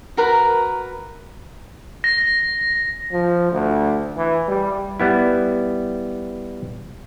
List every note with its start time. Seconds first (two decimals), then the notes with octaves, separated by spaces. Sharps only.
0.17 F#4 A#4 B4 A#5
2.04 A#6
3.12 F3
3.52 D2
4.17 E3
4.48 G3
5.00 G3 B3 E4